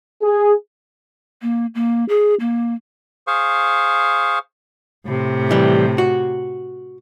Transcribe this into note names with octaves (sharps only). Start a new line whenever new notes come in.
G#4
A#3
A#3
G#4
A#3
G#4 C5 F5 C#6
A2 C3
E3 G3
F#4